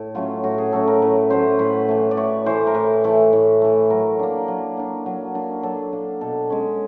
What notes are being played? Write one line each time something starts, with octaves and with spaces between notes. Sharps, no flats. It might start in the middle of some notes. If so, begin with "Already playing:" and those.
Already playing: A2 A4
F#3 A3 C#4 F4
A2 F#4
G#4
F#3 A3 C#4 A4
A#4
A2 B4
F#3 A3 C#4 C5
A2 B4
E3 A3
D5
A2 C#5
E3 A3 C5
A#4
A2 B4
E3 A3
A2
E3 A3
F#3 A#4
A#3 D4
F#3
A#3 D4
F#3
A#3 D4
F#3 A4
A#3 D4
B2 A4
G#3 C#4